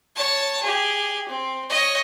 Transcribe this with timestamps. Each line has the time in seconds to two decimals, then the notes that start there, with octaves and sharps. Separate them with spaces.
0.16 C#5 A5
0.62 G4 G#4
1.28 C4
1.69 C#5 D#5